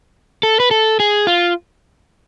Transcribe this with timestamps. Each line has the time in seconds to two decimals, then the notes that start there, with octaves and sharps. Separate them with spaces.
0.43 A4
0.60 B4
0.71 A4
1.00 G#4
1.27 F4